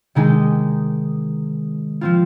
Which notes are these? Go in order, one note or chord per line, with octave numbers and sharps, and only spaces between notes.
C3 D#3 G#3 D#4
F3 C4 F4